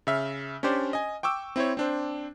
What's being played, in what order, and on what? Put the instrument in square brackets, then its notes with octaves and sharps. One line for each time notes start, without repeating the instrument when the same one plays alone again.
[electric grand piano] C#3 E5 F6
C#4 D4 G4 C5 D5
D#5 G#5
G5 C#6 D6 E6
C4 E4 C5 C#5
C4 D4 C5